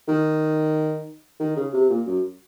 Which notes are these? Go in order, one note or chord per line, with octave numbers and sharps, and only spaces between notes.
D#3
D#3
C#3
C3
A#2
F#2